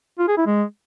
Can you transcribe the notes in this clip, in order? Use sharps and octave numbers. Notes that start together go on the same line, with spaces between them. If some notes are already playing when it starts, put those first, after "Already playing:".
F4
G#4
E4
G#3